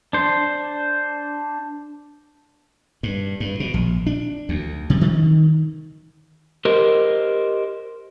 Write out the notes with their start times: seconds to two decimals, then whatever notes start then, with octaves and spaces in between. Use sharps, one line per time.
0.13 D4 C5
3.03 G2
3.40 G2
3.60 B2
3.74 A#1
4.07 D4
4.49 D2
4.90 C3
5.01 D#3
6.65 G4 A#4 C5 D#5